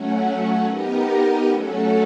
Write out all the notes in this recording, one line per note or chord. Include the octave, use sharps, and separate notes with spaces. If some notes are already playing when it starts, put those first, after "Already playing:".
Already playing: F#3 A3 C#4 F#4
B3 D#4 G4 A#4 D#5
F#3 A3 C#4 F#4 A4